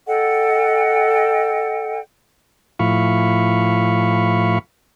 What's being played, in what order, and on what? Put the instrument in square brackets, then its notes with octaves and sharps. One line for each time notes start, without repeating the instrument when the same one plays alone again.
[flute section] A4 D#5 F#5 G5
[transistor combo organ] A2 F3 E4 F5 B5 C#6